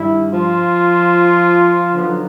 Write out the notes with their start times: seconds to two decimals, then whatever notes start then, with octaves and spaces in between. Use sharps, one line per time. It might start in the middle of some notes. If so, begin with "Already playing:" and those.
Already playing: G2 D#3 G3 E4
0.32 F3 F4
1.94 D3 F#3 B3 D#4